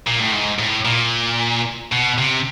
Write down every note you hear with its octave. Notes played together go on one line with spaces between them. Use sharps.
A#2
A2
G#2
A2
A#2
B2
C3